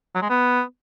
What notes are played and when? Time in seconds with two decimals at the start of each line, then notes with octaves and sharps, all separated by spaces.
0.15 F#3
0.22 G#3
0.29 B3